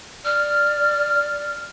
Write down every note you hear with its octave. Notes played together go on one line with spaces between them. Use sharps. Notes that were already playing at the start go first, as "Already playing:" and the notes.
D5 F6